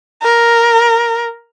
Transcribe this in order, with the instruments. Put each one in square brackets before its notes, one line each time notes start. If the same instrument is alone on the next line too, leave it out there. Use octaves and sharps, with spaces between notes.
[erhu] A#4